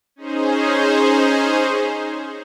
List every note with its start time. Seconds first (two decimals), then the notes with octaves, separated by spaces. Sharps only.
0.16 C#4 D#4 G#4 C5